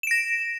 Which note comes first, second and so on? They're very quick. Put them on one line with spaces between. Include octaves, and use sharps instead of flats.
E7 D7 A#6